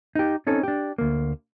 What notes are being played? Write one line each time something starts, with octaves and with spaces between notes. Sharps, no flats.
D#4 G4
C4 C#4 D#4 A4
D4 G4
D2 A#3